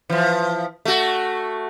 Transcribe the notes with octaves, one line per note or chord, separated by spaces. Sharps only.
E3 F3
A3 F#4